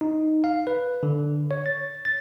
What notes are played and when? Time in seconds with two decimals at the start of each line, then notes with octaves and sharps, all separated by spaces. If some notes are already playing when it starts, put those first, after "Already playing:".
0.01 D#4
0.44 F5
0.67 B4
1.03 D3
1.51 C#5
1.66 A6
2.05 A6